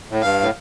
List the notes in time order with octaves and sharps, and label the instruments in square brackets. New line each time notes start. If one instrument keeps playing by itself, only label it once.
[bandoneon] A2
[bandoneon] G2 [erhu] F5
[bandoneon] A2